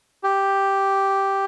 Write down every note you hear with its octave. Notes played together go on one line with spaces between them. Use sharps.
G4